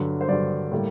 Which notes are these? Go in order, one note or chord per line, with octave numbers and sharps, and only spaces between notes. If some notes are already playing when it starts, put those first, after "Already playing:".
Already playing: G2 D3 F#3
C5
G2 D3 F#3 D5
A2 G3 A#3